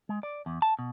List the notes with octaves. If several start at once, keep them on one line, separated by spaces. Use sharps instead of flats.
G#3
D5
E2
A5
B2